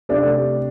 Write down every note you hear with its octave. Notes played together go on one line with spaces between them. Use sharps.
C3 A3 D4 G4